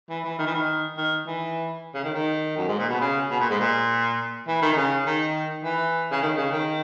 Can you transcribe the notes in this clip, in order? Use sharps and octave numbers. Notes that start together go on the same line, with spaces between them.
E3
E3
D#3
E3
D#3
D#3
E3
C#3
D#3
D#3
F#2
G#2
A#2
B2
C#3
B2
A#2
G#2
A#2
E3
D#3
D#3
C#3
D#3
E3
C#3
D#3
C#3
D#3